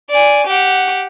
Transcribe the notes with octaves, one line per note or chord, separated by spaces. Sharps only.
D5 G#5
G4 F#5